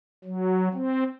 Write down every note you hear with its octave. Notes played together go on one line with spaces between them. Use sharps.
F#3
C4